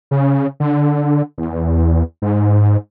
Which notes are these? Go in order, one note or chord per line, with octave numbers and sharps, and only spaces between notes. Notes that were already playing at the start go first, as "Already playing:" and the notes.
C#3
D3
E2
G#2